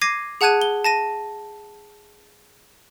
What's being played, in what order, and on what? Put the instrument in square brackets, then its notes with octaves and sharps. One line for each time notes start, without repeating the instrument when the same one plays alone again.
[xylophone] D6 G#6 A#6 C7 D#7
G#4 F#5 A5 F#6 G#6 D#7
G7
A5 A#6 D#7